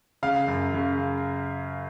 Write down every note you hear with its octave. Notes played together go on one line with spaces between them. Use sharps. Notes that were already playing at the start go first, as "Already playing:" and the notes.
C#3 F5
F#2
C#3